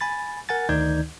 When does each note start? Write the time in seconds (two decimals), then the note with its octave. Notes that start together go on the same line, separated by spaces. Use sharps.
0.01 G#5 B5 A6
0.49 A#4 F#5 G#5 A6
0.69 D2 D#3 D#4 D5 G6 G#6